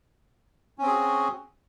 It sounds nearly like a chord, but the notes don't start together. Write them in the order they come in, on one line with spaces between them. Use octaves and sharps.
C#4 C4 G#4 F#4